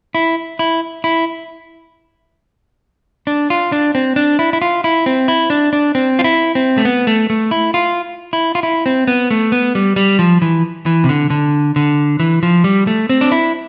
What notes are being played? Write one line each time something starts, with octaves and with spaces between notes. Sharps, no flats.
E4
E4
E4
D4
F4
D4
C4
D4
E4
E4
F4
E4
C4
E4
D4
D4
C4
F4
E4
C4
A3
B3
A3
A3
E4
F4
E4
F4
E4
C4
B3
A3
B3
G3
G3
F3
E3
E3
C3
D3
D3
D3
E3
F3
G3
A3
C4
D4
E4